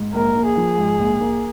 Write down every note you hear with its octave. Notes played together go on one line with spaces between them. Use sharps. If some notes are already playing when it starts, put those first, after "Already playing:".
Already playing: G#2
A#1 A#4
A#3
G#4
F3
G#2
A#1
A#3